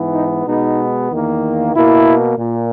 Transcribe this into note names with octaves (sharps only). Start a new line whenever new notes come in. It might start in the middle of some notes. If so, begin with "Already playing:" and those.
Already playing: G#2 E3 B3
D#4
B2 G#3 B3 D#4
E2 D#3 A#3
B2 A#3 E4
A#2